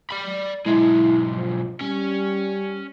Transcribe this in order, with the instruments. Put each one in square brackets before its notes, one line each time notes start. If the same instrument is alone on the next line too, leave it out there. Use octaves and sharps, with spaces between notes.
[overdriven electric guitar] D5 B5
[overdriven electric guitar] B1 G#3 [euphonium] E4
[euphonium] F3
[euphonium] G3 [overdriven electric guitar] C#4